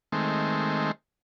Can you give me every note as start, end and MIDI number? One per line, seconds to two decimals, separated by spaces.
0.12 0.91 51
0.12 0.91 56
0.12 0.91 57
0.12 0.91 60